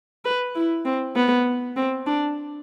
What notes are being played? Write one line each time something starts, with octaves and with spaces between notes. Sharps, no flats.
B4
E4
C4
B3
C4
D4